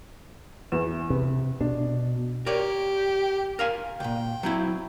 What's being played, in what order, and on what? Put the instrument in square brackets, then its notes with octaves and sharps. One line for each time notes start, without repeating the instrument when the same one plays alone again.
[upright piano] E2 B4 E7
[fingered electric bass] C3 [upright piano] B4
[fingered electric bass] B2 [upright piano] D4
[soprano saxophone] G4 [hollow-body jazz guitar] A#4 C#5 D5
[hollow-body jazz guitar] A#4 F5 G#5
[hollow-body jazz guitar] C#2 A#2 [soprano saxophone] G5
[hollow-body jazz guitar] F#3 C4 E4